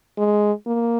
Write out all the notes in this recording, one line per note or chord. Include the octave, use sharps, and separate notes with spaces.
G#3
A#3